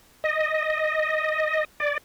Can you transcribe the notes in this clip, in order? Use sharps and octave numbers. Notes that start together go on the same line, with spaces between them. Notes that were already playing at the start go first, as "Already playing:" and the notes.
D#5
D5